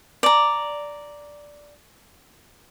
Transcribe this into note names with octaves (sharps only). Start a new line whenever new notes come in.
D5 A#5